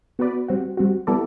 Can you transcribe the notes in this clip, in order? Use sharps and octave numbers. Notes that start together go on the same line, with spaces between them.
B3 F#4 B4 D5
G3 C4 F#4
G3 C4 F#4
G3 B3 E4 A4 D5